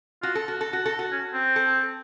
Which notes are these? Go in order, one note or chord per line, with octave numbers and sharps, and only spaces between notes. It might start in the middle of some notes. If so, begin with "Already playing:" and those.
F4 F#4
A4
F#4
A4
F#4
A4
F#4
C#4
C4
A4